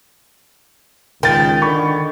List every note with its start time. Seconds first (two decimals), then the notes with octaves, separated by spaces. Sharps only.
1.23 C#2 D#3 G5 A6
1.62 D3 B5 C#6